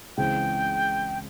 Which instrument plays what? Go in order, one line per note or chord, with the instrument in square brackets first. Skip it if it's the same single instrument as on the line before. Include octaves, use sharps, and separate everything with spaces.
[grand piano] C#2 C#3 E3 G#3 C4 [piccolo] G5